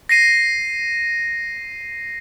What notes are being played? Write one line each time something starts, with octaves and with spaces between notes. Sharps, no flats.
A#6 C7 D#7